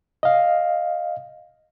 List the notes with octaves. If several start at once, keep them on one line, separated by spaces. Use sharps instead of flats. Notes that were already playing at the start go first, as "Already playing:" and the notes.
D#5 F5